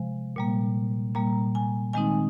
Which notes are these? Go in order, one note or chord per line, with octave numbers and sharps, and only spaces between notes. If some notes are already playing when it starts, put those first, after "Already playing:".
Already playing: C3 F3 G#3
A#2 G3 A#3
A#2 G3 A#3 A#5
G#5
D#3 G#3 C4 D#4 G#5